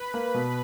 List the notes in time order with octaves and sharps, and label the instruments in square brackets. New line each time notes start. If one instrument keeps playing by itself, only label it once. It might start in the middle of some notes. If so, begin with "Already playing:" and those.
Already playing: [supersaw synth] B4 B5
[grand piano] A#3
B2